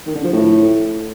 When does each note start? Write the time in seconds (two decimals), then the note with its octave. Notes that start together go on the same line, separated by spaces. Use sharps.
0.06 D#3
0.15 D3
0.24 F3
0.33 A2